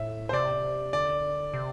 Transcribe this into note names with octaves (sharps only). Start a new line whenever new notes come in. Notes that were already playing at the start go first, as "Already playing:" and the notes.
Already playing: A2 E5
C5
C3 D5
D3 D5
C3